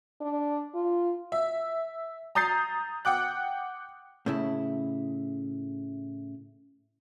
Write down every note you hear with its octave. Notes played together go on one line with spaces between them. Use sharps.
D4
F4
E5
A#5 D#6 G6 A6 C7
F#5 G5 D6 F#6
A2 C#3 E4